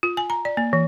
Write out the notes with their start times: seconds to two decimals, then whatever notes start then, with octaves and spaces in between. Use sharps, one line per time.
0.03 F4
0.17 G#5
0.30 A#5
0.45 D5
0.57 A#3
0.73 E3